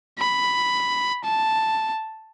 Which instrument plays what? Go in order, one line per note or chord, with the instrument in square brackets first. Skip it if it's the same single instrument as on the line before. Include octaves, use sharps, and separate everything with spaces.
[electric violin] B5
A5